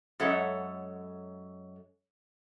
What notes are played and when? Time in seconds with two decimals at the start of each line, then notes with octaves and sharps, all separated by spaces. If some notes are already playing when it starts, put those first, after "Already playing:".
0.20 F#2 G#3 A4 C#5 E5 F#5